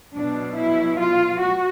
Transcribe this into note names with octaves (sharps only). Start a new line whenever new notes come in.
B2 F#3 D4
E4
F4
F#4